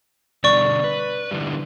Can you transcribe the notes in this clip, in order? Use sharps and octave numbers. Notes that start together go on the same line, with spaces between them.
B2 D3 G3 D5 C#6
B4
D3 E3 G3